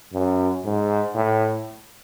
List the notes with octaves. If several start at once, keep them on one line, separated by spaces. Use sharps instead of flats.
F#2
G#2
A2